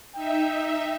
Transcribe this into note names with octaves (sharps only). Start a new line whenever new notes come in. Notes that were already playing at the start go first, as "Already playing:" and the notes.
D#4 E5 G5